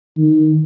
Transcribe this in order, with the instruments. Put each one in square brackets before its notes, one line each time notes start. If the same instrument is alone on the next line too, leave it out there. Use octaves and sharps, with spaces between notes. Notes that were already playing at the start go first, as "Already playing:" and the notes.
[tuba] D#3